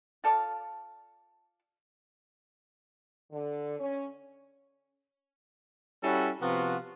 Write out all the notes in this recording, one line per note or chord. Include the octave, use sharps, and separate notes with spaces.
F4 A4 D5 F5
D3
C#4
G3 C#4 E4 F#4 A4
C3 F3 B3 F4 F#4